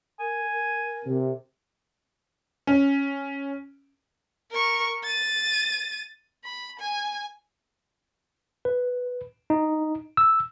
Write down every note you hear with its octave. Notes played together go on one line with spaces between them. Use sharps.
A#4 G#5
A#4
C3
C#4
A#4 C#6
A6 D#7
B5
G#5
B4
D#4
E6